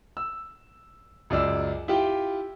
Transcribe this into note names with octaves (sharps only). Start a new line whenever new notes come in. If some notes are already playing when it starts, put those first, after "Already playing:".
E6
C#2 F#2 D5 E6
E4 F4 G4 G5